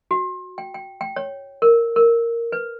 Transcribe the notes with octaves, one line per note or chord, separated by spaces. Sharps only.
F#4
G5
G5
G5
C#5
A#4
A#4
B4